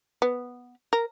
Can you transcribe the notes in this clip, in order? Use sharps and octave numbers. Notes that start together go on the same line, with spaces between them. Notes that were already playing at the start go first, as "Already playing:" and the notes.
B3
A#4